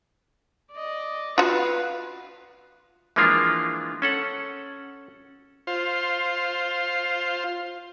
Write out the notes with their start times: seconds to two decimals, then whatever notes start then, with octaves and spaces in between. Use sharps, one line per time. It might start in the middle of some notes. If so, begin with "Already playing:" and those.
0.72 D5 D#5
1.38 F4 F#4 B4 F5
3.16 E3 F3 G#3 A#3 D4 F4
4.02 C#4 A4 F#5
5.67 F4 C5